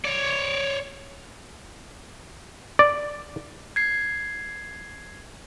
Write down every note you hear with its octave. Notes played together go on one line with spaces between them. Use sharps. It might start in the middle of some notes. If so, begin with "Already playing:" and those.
C#5 D5
D5
G#6 C7